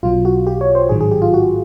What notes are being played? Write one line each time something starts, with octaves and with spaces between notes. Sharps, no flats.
B1 B2 F#3 F4
F#4
G4
C#5
C5
A1 G#2 D#3 F#3 G#4
G#4
G4
F4
F#4